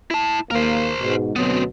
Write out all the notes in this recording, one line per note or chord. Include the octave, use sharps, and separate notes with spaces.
E4 A5
D#2 A#3 A#4 C5
G#2 B2
D2 B2 F#3 B3 C4